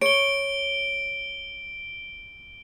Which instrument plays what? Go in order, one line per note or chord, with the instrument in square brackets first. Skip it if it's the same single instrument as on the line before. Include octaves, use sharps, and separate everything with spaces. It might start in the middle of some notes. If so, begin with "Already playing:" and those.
[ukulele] C#5 [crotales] D7 G7